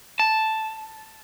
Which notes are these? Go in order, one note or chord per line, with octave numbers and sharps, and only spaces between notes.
A5